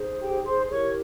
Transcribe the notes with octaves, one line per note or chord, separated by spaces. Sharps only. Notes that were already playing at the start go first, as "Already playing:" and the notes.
Already playing: D#4 G#4 C5
G4 G5
C5 C6
E4 G4 A#4 C#5 C#6